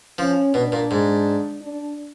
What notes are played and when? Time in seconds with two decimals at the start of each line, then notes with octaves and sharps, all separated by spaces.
0.18 F3 C#4
0.54 B2 D4
0.72 A#2
0.91 G#2
1.62 D4